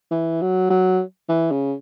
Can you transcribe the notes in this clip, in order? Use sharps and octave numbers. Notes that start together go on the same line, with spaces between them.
E3
F#3
F#3
E3
C#3